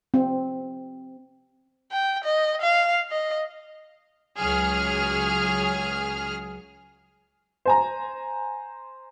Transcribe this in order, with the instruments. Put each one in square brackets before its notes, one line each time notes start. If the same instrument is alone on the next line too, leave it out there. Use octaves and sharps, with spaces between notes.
[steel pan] C4
[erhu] G5
D#5
F5
D#5
[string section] C#2 F#3 G#4 F6
[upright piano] C5 G#5 A#5